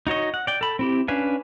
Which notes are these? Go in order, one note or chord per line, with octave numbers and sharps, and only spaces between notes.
D#4 F#4 C#5 D#5
F#5
D5 G5
A4 B5
C4 E4 G4
C#4 D4 B4 F5 G#5